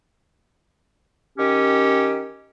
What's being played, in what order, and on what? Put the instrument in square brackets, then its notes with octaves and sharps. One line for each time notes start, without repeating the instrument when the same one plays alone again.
[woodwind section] D#3 C#4 G4